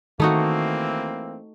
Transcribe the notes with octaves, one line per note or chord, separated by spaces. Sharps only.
D#3 E3 A3 A#3 C4 D#4 F#4